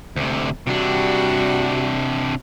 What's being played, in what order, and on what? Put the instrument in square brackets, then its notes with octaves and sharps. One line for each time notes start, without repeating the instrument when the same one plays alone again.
[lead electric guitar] D2 C3
[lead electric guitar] C3 D4 [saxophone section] G3 F#4